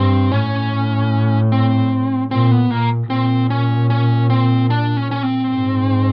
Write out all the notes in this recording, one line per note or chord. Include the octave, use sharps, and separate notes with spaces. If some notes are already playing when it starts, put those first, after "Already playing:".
Already playing: G2 C4
A2 C#4
C4
A#2 C4
B3
A#2 A#3
A#2 C4
C#4
C#4
C4
D4
C#4
C#4
C4
G#2